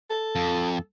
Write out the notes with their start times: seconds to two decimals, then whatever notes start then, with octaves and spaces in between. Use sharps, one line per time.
0.10 A4
0.36 F2